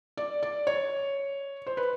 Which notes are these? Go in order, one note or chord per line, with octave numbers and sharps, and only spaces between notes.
D5
D5
C#5
C5
B4